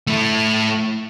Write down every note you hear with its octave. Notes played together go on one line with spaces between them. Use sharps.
A3 E4